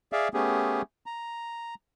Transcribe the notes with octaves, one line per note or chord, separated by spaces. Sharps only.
G#4 D5 E5 F5
A3 B3 C#4 G4 G#4
A#5